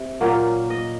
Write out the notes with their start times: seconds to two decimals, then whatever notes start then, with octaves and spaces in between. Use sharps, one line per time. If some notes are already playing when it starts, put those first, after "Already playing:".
Already playing: C3
0.21 A#2 F#3 A#3 C#4
0.70 D#5